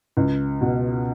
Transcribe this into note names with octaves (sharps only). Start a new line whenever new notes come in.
C#2
B2